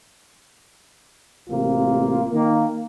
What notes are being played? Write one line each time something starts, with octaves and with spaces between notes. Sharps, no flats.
A1 C3 A#3 F4
D#3 A#3